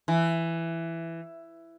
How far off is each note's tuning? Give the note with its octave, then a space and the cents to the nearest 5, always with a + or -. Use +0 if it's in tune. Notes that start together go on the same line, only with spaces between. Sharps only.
E3 +10